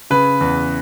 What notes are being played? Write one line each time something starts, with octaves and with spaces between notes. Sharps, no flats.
C#3 B4
E2